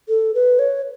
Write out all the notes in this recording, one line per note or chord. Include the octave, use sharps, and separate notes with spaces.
A4
B4
C#5